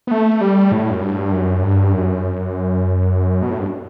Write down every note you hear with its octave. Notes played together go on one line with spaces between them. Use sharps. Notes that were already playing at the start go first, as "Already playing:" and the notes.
B3
A3
G3
A2
F#2
G2
F#2
G2
F#2
B2
A2
G2